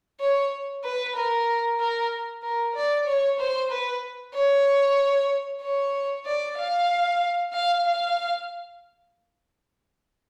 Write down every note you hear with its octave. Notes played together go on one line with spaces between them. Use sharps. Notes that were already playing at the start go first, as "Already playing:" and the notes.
C#5
B4
A#4
A#4
A#4
D5
C#5
C5
B4
C#5
C#5
D5
F5
F5
F5